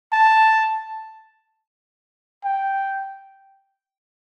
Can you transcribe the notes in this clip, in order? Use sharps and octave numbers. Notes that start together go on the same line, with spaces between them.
A5
G5